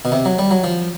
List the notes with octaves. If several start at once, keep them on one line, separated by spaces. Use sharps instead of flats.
B2
C3
F#3
G3
F#3
F3